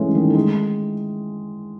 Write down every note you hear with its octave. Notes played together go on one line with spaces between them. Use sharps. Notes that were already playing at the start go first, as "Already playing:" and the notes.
Already playing: E3 G#3 A3 C#4
D#3
A3
G#3